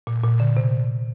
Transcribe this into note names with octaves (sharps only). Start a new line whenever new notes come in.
A#2
A#2
D3
C3